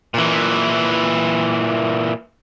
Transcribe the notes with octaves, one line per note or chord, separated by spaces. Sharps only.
A#2 E3